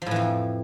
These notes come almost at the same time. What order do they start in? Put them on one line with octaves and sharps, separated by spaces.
F3 A2 E3 F2